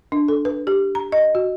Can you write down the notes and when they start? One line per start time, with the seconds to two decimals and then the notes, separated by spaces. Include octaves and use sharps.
0.12 D4
0.28 A4
0.45 B4
0.67 G4
0.95 A#5
1.12 D#5
1.35 F#4